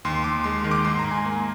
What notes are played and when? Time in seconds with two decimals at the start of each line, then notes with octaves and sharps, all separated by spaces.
0.05 D#2 C6
0.24 D#2 D6
0.44 G#3 C6
0.64 D#3
0.71 D6
0.85 G#2 C6
0.99 A#5
1.04 G#2
1.11 G#5
1.26 A#3